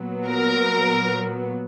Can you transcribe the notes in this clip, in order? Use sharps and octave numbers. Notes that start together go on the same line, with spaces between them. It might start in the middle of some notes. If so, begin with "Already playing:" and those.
Already playing: A#2 F#3 B3
A#4